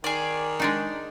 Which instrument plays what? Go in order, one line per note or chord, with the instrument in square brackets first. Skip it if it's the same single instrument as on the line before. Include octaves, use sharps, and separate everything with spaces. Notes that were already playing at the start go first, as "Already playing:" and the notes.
[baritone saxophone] D#3 [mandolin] G#4 D5
[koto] G#3 D4 D#4